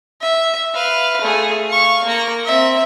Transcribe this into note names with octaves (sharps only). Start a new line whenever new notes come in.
E5
B4 F5
A3 G#4
F5 C#6
A#3 A#5
C4 E5